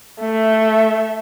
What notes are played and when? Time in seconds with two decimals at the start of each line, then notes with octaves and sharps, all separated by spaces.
0.20 A3 E5